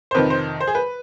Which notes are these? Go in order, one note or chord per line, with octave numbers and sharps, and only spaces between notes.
C5
F2 C3 D#3 B4
C5
C5
G#4
B4